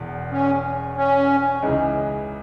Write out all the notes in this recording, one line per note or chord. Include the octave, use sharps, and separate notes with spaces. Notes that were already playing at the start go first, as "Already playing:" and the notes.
Already playing: E1 E2
C#4
C#4
C#2 C#3 E3 G#3 D#4